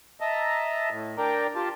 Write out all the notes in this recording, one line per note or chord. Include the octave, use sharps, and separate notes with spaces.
D#5 E5 A5 A#5
A2
D4 A#4 D5 G5 A#5
F4 G4 A5